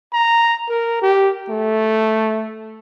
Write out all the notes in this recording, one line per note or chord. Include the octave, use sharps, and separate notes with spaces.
A#5
A#4
G4
A3